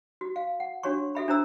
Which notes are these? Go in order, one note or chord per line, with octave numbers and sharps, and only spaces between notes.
F#4
F5
F#5
D4 F#4 C#5 C6 C#6
F#4 A4 E5 B5
D4 E4 C5 A#5 E6